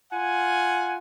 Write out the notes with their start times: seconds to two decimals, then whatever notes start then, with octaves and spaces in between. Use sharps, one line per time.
0.13 F4 F#5 G#5